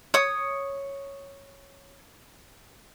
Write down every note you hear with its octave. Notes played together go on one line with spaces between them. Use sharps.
C#5 D#6